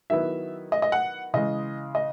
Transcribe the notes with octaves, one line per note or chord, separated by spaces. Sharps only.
D#3 F#3 B3 E4 E5
D#5
D#5
F#5
C#3 E3 G#3 D#5
D#5